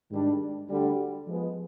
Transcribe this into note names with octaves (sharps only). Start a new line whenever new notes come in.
G#2 D#3 G3 D4
D2 D3 G3
F3 G#3 B3